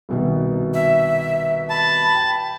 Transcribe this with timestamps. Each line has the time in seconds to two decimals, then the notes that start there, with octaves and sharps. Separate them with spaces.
0.09 C2 B2 D#3
0.74 E5
1.70 A5 B5
2.15 G5